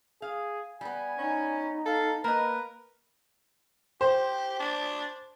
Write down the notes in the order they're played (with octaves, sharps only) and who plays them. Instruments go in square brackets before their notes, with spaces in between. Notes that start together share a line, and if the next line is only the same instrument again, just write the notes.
[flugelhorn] G#4 [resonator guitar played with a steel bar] F5
[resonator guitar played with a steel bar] G3 B3 [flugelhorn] G#5
[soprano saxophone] C#4 [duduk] D#4
[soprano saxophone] A4 [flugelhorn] F5
[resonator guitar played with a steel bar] A#3 D#5 [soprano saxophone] A#4 [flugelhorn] B4
[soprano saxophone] G4 [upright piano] C5
[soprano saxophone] D4